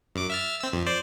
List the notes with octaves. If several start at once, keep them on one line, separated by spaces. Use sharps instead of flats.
F#2 D6
E5 F6 A6
C4 E6
F2
C5 D5